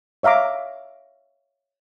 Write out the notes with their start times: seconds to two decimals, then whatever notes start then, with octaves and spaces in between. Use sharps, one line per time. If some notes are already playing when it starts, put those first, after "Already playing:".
0.23 C#5 E5 F5 A#5 D6